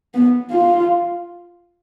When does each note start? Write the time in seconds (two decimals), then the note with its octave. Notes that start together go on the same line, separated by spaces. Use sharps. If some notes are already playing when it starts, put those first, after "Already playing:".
0.14 B3
0.51 F4